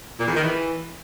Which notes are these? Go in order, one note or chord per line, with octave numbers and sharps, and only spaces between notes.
A#2
E2
D#3
E3